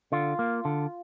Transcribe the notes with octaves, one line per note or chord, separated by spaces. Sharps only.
D3 F4
A#3
D3